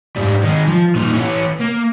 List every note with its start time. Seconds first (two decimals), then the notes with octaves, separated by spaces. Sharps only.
0.16 G#2 G3
0.44 D#3 G#3
0.68 F3
0.95 A#2 D#4
1.13 E3 C#4
1.60 A#3